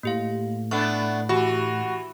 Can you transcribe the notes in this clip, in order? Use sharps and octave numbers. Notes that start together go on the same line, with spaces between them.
A2 A#3 G4 F5
A3 B3 D4 C#6
E3 F#4 G4 B5